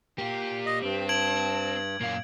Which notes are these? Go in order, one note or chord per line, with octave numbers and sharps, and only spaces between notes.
A#3 F4 G4
D#5
G2 C4
A5 G#6 D7 F#7
F#2 A#2 A#3 F5